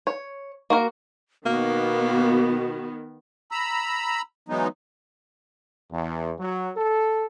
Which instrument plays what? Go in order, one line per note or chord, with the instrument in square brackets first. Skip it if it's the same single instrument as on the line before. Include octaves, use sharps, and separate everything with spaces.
[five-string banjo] C#5
A#3 F#4 A#4
[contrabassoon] B2 [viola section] D#3 B3 [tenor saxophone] A#3 [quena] F#4
[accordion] A#5 B5 E6
E3 F#3 G#3 B3 D#4
[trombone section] E2
F#3
A4